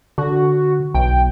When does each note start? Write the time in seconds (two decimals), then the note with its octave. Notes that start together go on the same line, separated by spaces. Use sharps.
0.18 D3 F#4
0.94 B1 G5